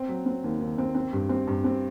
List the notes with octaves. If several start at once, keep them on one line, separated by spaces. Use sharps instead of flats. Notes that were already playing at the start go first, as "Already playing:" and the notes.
Already playing: C4
F#3
C4
D#2
D#2
C4
C4
G2
C4
G2
C4